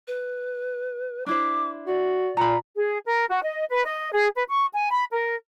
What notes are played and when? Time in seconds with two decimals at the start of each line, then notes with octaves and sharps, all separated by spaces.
0.08 B4
1.26 D4 E4 C5 D6
1.87 F#4 D5
2.37 A#2 A#5 B5
2.76 G#4
3.06 A#4
3.29 F#4
3.43 D#5
3.69 B4
3.85 D#5
4.12 G#4
4.35 B4
4.49 C#6
4.72 G#5
4.90 B5
5.12 A#4